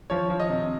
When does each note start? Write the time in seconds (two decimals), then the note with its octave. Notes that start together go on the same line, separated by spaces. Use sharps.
0.10 F3 C#5
0.30 F3
0.40 D#5
0.50 C3